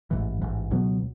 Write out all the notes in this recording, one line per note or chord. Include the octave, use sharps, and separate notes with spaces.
A1 G#2 E3
A1 G#2 E3
C#2 B2 F#3 B3